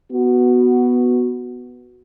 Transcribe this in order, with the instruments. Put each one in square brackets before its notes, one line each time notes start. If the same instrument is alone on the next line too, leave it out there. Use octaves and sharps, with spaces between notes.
[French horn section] B3 F#4